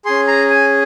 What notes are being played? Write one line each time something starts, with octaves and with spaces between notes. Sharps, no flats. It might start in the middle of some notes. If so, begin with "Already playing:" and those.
C#4 G#4 C6
A#5
G#5